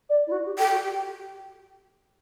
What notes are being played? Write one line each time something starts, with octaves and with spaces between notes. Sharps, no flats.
D5
E4
F#4
G4
A4 G5
F#4
G4